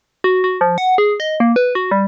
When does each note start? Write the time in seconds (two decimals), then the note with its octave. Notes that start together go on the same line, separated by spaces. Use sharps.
0.24 F#4
0.44 F#4
0.61 F3
0.78 F#5
0.98 G#4
1.20 D#5
1.40 A#3
1.56 B4
1.75 F#4
1.91 G3